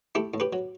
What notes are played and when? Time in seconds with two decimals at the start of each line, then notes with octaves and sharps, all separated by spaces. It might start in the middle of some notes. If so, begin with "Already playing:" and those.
0.15 A3 E4 G4
0.34 A2
0.40 G4 B4
0.53 F#3